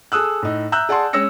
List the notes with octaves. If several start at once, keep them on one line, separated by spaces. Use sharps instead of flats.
G#4 A4 D#6 E6 F#6
A2 D#4
E5 A#5 E6 F#6 G6
G#4 D5 F#5 G#5 A5 C6
G#3 C#4 C#5 E6 A#6 C#7